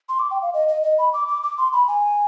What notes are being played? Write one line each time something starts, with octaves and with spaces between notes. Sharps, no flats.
C6
D6
G5
F5
D#5
D#5
D#5
B5
D6
D6
D6
C6
B5
G#5